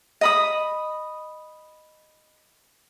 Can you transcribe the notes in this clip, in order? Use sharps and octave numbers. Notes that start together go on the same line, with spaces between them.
D#5 B5 D#6